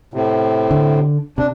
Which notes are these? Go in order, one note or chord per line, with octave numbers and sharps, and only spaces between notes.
A2 C3
D3
C3 D4